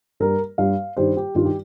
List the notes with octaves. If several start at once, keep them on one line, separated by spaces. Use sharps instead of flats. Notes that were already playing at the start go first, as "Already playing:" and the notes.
G2 G3 A#4
G2 G3 F5
G2 D#3 G3 C5
G4
G2 D#3 G3 F4
G4